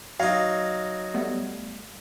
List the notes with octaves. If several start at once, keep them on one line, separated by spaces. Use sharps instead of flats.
F#3 D#4 F5
G3 A3 B3